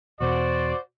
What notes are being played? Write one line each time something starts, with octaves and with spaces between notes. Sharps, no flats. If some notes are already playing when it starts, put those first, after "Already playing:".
E2 B2 F#4 C5 D5